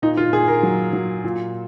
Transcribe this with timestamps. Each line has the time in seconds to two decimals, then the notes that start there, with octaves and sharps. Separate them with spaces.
0.02 A#2 D#4
0.17 F4
0.33 A#2 G#4
0.48 A#4
0.63 F#3
0.93 F#3
1.24 A#2